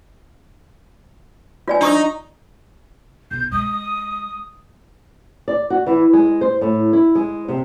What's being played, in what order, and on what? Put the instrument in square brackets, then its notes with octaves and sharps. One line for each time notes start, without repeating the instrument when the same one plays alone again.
[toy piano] F4 D5 G#5
[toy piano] D4 C#6 D#6 [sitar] D#4
[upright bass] B1 [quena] G6
[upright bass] G#3 [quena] D#6
[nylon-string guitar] D5
F#4
E3
G#3
C5
A2
E4
G#3
C3